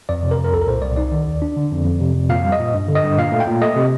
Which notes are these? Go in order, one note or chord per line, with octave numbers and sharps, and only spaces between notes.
F2 D5
C3
A#4
F2
A#4
C2 A4
A#4
A#2 C5
C2 D5
D#4 D5
D#3
D#2
D4
D3
F2
F2
C3
F2
A#2 F5
G3
D#5
A#2
G2
D3
D#5
G2
A#2 F5
A3
G5
A#2
A3 D#5
C3